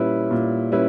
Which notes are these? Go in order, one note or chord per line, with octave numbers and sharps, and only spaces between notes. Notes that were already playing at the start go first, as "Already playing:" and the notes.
Already playing: A#2 G3 C#4 E4 B4
A#2
G3 C#4 E4 B4